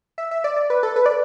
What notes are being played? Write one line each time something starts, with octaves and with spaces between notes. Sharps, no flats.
E5
E5
D5
D5
B4
A4
B4
D5